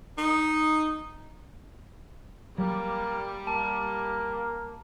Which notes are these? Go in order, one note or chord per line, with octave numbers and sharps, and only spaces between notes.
D#4
F#3 G3 A#3
A#3 A5